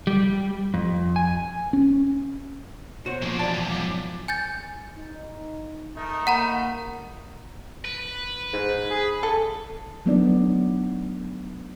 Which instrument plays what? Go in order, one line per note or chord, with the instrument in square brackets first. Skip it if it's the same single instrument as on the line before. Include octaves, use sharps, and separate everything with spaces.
[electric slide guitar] G3
F2
G#5
[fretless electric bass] C#4
[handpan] B2 [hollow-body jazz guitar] F#4 C#5 [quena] C5
[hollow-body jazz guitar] A#2 [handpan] F3 [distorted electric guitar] G#3 D4
[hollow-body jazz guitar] E2 A5 [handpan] F4 [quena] D5
[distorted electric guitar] G#2 G3
[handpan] F#3 [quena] D6
[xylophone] G#5 G6 A6
[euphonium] D#4
[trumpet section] A3 D#4 A#4
[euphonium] A#3 [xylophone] F#5 A#5 B5
[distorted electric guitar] B4
[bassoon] G#2
G#4
[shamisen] A4
[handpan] F#3 A3 B3 D4 D#4 D5